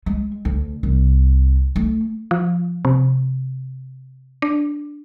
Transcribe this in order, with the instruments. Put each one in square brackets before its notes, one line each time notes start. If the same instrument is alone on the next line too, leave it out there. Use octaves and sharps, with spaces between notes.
[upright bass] G#3
D2
C2
A3
[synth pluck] F3
C3
D4